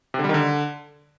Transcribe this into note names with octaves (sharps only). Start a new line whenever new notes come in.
C3
D3
G3
D#3
D3